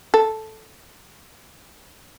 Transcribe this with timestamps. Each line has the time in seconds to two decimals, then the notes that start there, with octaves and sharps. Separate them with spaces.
0.14 A4